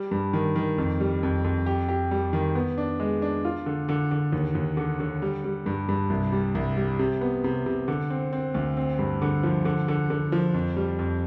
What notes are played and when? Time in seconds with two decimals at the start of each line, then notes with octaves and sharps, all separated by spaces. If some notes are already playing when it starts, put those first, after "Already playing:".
Already playing: G3
0.11 G2
0.33 D#3
0.56 D#3
0.78 F2
1.00 G3
1.23 F2
1.44 F2
1.66 G4
1.89 G4
2.11 G3
2.33 D#3
2.55 B3
2.78 D4
3.00 G#3
3.22 D4
3.45 F4
3.66 D3
3.89 D3
4.11 D3
4.32 D#2
4.55 D#2
4.77 D3
5.00 D3
5.22 G3
5.44 G3
5.66 G2
5.89 G2
6.10 C2
6.32 G3
6.55 C2
6.77 G3
6.99 C3
7.21 B3
7.44 C3
7.66 C3
7.88 D3
8.10 C4
8.33 C4
8.54 D2
8.77 C4
8.99 G2
9.22 D3
9.43 F3
9.65 D3
9.88 D3
10.10 D3
10.32 F3
10.54 F2
10.76 G3
10.99 F2